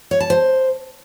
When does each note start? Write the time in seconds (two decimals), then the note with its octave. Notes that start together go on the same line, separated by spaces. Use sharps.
0.11 C#5
0.20 A5
0.30 C5